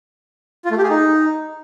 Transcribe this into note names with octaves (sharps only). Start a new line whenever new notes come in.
F4
A3
G4
G#4
D#4